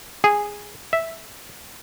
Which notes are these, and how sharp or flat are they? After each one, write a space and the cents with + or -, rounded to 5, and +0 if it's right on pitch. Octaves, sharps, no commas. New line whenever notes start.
G#4 -10
E5 -5